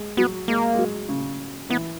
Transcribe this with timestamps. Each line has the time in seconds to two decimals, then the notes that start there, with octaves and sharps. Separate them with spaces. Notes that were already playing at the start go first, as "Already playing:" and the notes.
Already playing: G#3
0.17 F#3 B3
0.48 G#3 A#3
0.74 G#3
0.78 F#3
1.09 C#3
1.70 E3 B3